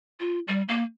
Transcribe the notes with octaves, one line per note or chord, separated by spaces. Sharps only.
F4
G3
A#3